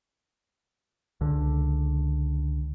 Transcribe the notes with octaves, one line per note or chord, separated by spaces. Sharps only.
C#2 D3